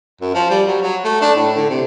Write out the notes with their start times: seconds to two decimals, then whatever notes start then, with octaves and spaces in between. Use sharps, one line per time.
0.21 F#2
0.34 F3
0.50 G3
0.68 F#3
0.82 F#3
1.04 A3
1.22 D4
1.35 A2
1.56 D3
1.70 C3